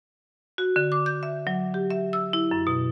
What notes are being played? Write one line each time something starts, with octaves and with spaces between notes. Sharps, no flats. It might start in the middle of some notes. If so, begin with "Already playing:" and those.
F#4
D3
D6
G6
E5
F#3
G4
E5
E6
E4
F#2
B2